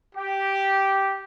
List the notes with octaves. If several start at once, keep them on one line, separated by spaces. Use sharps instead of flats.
G4